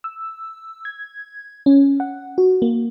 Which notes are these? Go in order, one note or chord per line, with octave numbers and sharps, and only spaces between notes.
E6
G#6
C#4
F#5
F#4
A#3